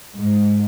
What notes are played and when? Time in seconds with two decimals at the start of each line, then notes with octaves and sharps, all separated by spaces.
0.16 G#2